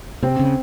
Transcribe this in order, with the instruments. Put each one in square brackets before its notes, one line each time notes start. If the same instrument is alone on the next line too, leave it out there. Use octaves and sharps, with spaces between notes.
[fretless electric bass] C3 [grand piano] C4
[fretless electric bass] C#3